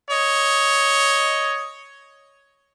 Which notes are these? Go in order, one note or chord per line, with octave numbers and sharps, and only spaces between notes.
C#5 D#5